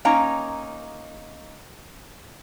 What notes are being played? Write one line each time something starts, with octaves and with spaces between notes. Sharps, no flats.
A#3 C#4 D#4 A#5